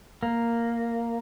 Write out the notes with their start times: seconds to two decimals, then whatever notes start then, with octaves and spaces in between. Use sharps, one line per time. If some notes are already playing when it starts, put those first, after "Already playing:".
0.23 A#3